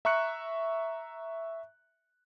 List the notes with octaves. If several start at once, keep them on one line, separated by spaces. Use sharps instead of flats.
E5 A#5 C#6 F#6 C#7